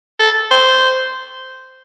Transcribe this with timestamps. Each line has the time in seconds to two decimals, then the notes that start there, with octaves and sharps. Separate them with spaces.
0.20 A4
0.51 C5